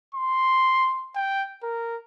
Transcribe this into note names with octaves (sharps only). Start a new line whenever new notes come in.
C6
G5
A#4